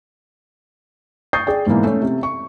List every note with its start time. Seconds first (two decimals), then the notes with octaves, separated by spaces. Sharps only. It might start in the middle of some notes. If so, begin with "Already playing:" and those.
1.33 C#6 D#6 G6 A6 C7
1.47 G#4 D5 G5
1.66 G#2 B2 E3 A#3
1.84 A3 C#4
2.01 C3
2.23 C#6